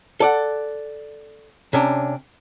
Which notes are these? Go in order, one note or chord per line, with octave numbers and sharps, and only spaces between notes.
A4 D5 F#5
C3 C#4 D4